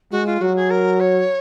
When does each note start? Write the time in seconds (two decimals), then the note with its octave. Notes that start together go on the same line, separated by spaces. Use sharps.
0.12 G#3 F#4
0.26 F4
0.41 F#3 F#4
0.56 G#4
0.70 A#4
1.00 C#5